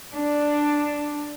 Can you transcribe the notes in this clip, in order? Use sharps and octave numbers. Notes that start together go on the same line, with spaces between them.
D4